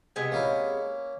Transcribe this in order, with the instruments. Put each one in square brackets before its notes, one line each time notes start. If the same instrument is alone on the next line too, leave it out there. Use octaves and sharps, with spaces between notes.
[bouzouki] C3 G#3 B3
[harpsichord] A#3 C#4 E4